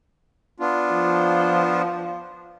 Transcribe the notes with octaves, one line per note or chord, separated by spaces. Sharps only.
B3 D4 F4
F3